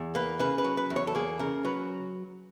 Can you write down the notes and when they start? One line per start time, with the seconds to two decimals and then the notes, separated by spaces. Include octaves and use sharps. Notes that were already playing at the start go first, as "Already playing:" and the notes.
Already playing: E2
0.15 A#3 B4
0.39 C#3 B4
0.58 B4
0.64 F#3
0.77 B4
0.90 E2
0.96 C#5
1.07 A4
1.15 A#3 G#4
1.39 C#3 A#4
1.65 F#3 B4